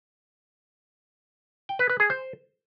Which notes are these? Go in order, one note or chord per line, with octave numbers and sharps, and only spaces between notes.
G5
B4
B4
G#4
C5